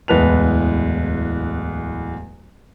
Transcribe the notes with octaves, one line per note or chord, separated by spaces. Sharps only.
D1 E2 G#3 B4 A5 F7